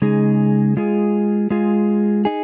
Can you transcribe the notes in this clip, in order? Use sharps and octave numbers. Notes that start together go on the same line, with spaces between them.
C#3 G#3 D#4 G#4
G#3 F4 G#4
G#3 F4 G#4
D#4 G#4